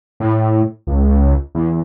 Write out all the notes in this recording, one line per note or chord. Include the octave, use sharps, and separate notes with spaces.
A2
C#2
E2